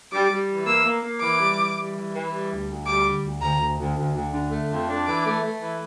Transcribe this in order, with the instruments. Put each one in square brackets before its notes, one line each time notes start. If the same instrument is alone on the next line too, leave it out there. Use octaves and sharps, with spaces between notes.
[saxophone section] G3 [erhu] D6
[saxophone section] G3
E3
[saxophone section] A#3 [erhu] E6
[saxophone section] A#3
A#3
[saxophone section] E3 [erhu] D6
[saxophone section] G3
E3
G3
E3
E3
G3
D2
D2
[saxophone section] G3 [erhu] D6
[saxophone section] D3
D2
[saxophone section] D2 [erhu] A#5
[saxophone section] D2
D2
D2
D2
D3
A3
F2
D4
[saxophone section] E3 [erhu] D6
[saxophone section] A3
A3
E3